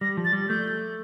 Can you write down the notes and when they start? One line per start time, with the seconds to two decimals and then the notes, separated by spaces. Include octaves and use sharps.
0.01 G3 A#6
0.17 F3
0.25 A6
0.33 G3
0.49 A3 G6